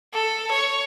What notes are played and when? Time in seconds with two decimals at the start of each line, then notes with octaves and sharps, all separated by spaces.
0.14 A4
0.52 C#5